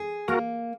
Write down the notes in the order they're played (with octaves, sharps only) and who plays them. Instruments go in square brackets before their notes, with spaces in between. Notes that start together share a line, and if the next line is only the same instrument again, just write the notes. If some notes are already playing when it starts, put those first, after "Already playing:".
Already playing: [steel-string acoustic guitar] G#4
[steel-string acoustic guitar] A#3 [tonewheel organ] F#4 A#4